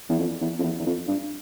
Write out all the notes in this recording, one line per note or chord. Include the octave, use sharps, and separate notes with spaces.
E2
F2
E2
F2
E2
E2
F2
G2